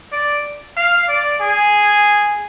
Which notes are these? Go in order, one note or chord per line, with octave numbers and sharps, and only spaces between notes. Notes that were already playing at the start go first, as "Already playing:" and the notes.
D5
F5
D5
G#4